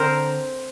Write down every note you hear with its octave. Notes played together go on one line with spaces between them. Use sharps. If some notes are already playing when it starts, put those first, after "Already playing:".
Already playing: D3 C4 A#4 C5